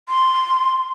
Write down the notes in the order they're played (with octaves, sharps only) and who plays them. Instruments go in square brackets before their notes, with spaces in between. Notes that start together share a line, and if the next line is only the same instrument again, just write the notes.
[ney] C6